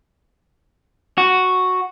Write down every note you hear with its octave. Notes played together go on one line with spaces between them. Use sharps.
F#4